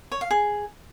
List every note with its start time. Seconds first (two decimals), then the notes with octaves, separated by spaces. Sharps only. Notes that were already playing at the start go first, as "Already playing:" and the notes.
0.12 C#5
0.21 F5
0.31 G#4